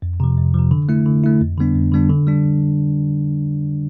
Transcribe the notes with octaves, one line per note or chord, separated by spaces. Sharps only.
F2
C3 F3
F2
C3 F3
D3
A3 E4
D3
A3 E4
F2
D3 G3 B3 D4
F2
D3 G3 B3 D4
D3
G3 D4